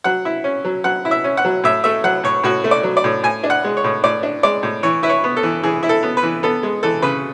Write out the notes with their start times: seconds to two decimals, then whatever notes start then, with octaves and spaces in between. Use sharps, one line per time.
0.04 F#3 F#5
0.25 E4
0.44 C#4
0.64 F#3
0.84 F#3 F#5
1.05 E4
1.11 E5
1.24 C#4
1.37 F#5
1.45 F#3
1.64 A2 E5
1.84 A3 E5
2.04 F#3 F#5
2.24 A2 C#5
2.43 A2 F#4
2.64 A3
2.71 D5
2.83 F#3
2.97 D5
3.04 A2
3.24 A2 G#5
3.44 D4
3.50 F#5
3.64 G#3
3.77 C#5
3.84 A2
4.04 A2 D5
4.23 D4
4.43 G#3 D5
4.63 A2
4.83 E3 C#5
5.03 E4 B4
5.09 C#5
5.24 B3
5.37 A4
5.43 E3
5.63 E3 G#4
5.83 E4
5.89 A4
6.03 B3
6.17 B4
6.23 E3
6.43 B3 A4
6.63 G#3
6.83 E3 A4
7.02 C#3 B4